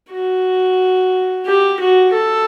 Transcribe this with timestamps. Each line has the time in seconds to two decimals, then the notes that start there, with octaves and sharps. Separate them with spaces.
0.12 F#4
1.46 G4
1.80 F#4
2.13 A4